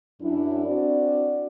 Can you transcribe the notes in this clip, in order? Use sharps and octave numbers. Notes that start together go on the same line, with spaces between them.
F#2 D4 E4
C4 D4 F#4 D5